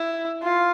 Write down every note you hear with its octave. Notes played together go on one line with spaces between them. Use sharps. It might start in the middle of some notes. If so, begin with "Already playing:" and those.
Already playing: E4
F4